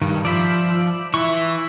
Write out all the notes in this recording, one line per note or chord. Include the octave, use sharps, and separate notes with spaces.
G2 D#3
F3 D5 E5 B5
E3 E4 E5 C#6